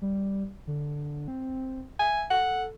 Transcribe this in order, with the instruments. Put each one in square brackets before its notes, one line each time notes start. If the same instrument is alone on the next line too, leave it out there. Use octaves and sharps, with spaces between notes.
[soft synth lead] G3
D3
C4
[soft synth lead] E5 [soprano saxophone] G#5
[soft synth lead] A4 [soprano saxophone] F#5